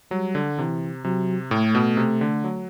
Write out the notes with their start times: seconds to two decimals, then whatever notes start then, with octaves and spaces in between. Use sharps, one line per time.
0.11 F#3 G3
0.35 D3
0.58 C3 E3
1.04 C3 F#3
1.51 A2 A3
1.75 B2
1.97 C3
2.21 D3
2.44 F#3